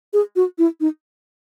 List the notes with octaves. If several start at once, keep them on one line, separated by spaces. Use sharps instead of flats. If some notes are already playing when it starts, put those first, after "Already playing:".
G#4
F#4
E4
D#4